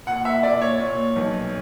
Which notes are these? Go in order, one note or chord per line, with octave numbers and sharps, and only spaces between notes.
A#2 F#5
E5
A#2 D5
C#5
A#2
B1